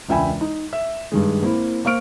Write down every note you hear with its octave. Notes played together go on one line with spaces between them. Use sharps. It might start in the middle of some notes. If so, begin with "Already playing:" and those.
E1 C#2 E5 G5 G#5 B5
D#4
E5
G2 D#3 G#3
A#3 C4 E4
A#3 C5 F5 C#6 F6 D7